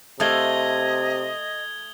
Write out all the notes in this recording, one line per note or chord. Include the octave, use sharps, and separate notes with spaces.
C3 A3 F4 D#5 D#6 G#6 G7